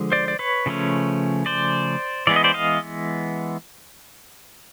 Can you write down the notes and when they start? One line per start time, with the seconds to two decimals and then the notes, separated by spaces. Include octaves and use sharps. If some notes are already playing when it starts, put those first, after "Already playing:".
Already playing: D3 F3 G#3
0.12 C5 D5
0.28 D5
0.39 B4 C#5
0.66 C#3 F3 A3 C#4
1.46 C5 D5
2.27 E3 G#3 B3 D5
2.36 D#5
2.44 C5 D5
2.54 D#5 F5